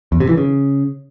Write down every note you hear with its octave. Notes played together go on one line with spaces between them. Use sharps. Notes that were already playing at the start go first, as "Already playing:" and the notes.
E2
C3
E3
C#3